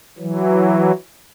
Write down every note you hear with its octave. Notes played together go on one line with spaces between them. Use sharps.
E3 F#3